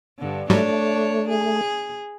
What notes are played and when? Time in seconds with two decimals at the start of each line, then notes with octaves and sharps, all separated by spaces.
0.19 G2 D3
0.50 G#2 F#3 G3 A3 D4 C#5
1.29 G#4